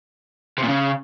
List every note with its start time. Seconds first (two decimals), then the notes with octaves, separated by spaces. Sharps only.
0.58 C3
0.63 A#2
0.69 C#3